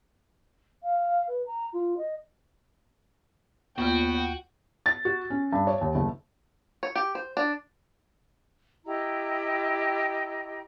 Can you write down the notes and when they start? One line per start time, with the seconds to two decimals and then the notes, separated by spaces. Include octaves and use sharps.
0.83 F5
1.28 B4
1.46 A#5
1.73 F4
1.97 D#5
3.78 D#2 A#3 B3 F4 F#4 G5
4.86 A6
5.05 F#4
5.30 C#4
5.53 G2
5.67 C#5
5.81 D#2
5.95 F#1
6.83 C#5
6.96 G4
7.15 C5
7.37 D4
8.86 E4 G4 D#5 A#5